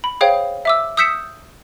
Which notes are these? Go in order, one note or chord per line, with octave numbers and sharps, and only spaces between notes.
B5
G#4 C5 C#5 F5 G5
E5 D6 E6
D#6 E6 G6 B6 C#7 E7